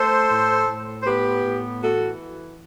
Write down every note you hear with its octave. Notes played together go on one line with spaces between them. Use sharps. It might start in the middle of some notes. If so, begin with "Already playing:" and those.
Already playing: A3 A4 C5
A2
A2
C5
B3 G4 B4
A2
E3 F#4 A4